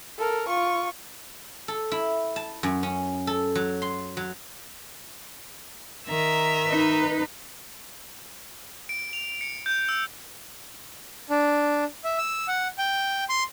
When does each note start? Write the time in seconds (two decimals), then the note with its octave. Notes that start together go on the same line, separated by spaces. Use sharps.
0.18 A4 A#4
0.48 F4 C#6
1.68 A4
1.92 E4
2.36 A5
2.63 F#2
2.83 C#4
3.27 A4
3.55 F#3
3.82 C6
4.17 F#3
6.07 D#3 E5 A#5
6.68 D#4 B4
8.89 D7
9.13 F7
9.41 C#7
9.66 G6
9.89 E6
11.30 D4
12.04 E5
12.18 E6
12.48 F#5
12.78 G5
13.29 C6